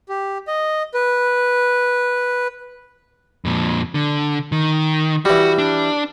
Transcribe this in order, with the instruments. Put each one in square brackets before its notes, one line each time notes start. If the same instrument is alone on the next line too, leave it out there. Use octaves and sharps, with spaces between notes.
[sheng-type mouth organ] G4
D#5
B4
[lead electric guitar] F2 A#2
D3
D#3
[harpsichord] E3 G3 [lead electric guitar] F#4
[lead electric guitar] D4